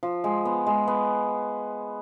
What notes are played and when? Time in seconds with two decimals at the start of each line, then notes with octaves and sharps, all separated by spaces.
0.03 F3
0.24 G#3
0.45 B3
0.67 G#3
0.87 B3